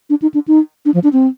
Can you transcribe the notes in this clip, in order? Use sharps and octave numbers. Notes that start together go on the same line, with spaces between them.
D4
D#4
D4
D#4
D4
F3
D4
C4